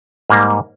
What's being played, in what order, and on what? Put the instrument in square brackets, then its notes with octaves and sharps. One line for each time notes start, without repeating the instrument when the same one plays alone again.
[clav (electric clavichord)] G#2 G3 A#3